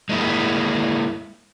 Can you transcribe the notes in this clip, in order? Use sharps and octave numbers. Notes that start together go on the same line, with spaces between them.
G#3 A#3 E4